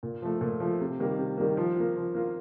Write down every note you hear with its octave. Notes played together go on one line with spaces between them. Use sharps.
A#2
F3 A3
A#2
F3 A3
C3
D#3 G3 A#3
C3
D#3 G3 A#3
F3
A#3 F4
F3
A#3 F4